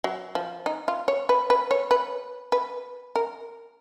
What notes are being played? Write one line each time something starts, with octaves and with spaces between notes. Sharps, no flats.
F#3
F3
D#4
F4
C#5
B4
B4
C#5
B4
B4
A#4